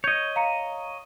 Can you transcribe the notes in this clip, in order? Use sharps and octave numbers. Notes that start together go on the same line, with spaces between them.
C#5 D#5 G6 G#6
F5 A#5 C#7